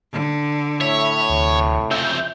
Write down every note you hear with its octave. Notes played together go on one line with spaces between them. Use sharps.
D3
A2 C#5 E5 B5
D2 C3
F2 C#3 E5 G6